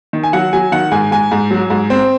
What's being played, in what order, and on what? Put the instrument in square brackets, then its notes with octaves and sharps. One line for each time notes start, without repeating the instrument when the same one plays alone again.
[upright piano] D#3
G#5
F#3 F#5
F#3 G#5
D#3 F#5
G#2 G#5
G#2 G#5
G#2
F#3
G#2
C4